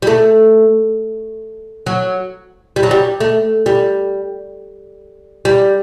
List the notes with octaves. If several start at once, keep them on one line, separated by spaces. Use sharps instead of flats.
G3
A3
F#3
G3
F#3
G3
A3
G3
G3